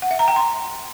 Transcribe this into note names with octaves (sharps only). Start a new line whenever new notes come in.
F#5
E5
A#5
G5
C6